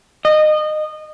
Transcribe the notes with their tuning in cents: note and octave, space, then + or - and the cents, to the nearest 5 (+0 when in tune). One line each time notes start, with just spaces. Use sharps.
D#5 -25